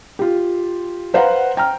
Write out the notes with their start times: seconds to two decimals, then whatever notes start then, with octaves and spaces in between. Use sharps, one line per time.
0.19 F4 G4
1.14 B4 C5 F5 F#5 A#5
1.57 G5 A#5 F6